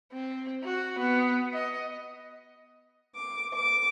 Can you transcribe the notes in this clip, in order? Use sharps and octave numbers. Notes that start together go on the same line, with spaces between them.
C4
F#4
B3
D#5
D6
D6